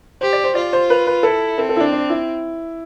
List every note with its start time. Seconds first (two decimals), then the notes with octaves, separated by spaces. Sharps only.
0.21 G4 C5
0.33 D5
0.44 C5
0.55 F4 D5
0.73 C5
0.90 B4
1.07 B4
1.23 E4 A4
1.58 C4 A4
1.69 A4
1.76 E4
1.80 D4
1.92 D4
2.10 E4